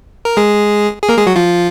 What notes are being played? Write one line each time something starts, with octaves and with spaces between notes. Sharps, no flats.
A#4
G#3 G#4
G#4
A#3 A#4
G#3 G#4
F#3 F#4
F3 F4